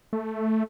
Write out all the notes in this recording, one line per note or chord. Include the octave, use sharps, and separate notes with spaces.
A3